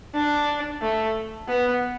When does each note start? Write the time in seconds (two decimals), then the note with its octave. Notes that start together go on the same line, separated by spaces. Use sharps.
0.14 D4
0.82 A3
1.48 B3